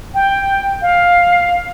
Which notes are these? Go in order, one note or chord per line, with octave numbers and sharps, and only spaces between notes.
G5
F5